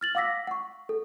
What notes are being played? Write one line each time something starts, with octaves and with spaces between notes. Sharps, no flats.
F6 A6 F#7
F5 F#5 D6 E6 A#6 B6
F#5 C#6
A4